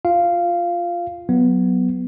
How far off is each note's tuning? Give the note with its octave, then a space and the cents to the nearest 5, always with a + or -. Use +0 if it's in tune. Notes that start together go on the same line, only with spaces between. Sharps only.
F4 +0 F5 -10
F#3 +0 B3 +0